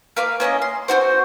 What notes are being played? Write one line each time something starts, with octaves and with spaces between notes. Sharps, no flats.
A#3 B4 F5 D6
A#3 C#4 E4 D#5
C6
C4 E4 F#4 C5